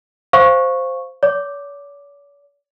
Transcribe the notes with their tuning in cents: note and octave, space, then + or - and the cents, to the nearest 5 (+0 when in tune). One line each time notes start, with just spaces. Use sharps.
C5 +0 F5 +0 C#6 -10
C#5 +45 D6 +0